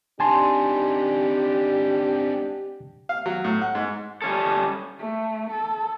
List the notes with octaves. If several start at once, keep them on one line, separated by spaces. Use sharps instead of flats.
C4 D4 D#4 G4 G#5 A5 C6
F5
F#3
A2
F#5
G#2
G3 C#4 A4
A3
A4